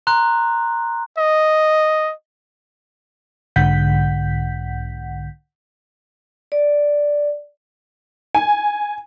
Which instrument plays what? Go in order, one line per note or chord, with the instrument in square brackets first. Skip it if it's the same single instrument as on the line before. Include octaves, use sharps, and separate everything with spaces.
[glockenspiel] A#5 C6 F#6
[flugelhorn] D#5
[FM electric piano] B1 G#2 D3 F#5 G6 B6
[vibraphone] D5
[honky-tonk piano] G#5